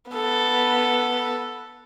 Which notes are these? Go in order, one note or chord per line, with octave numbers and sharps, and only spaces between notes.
B3 A4